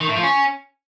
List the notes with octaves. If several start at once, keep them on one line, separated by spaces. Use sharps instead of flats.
D#3
A2
F3
C#4